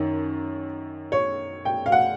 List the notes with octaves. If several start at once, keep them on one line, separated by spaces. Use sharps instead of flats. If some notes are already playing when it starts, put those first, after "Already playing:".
Already playing: F#2 D#3
C#5
G5
F5
F#5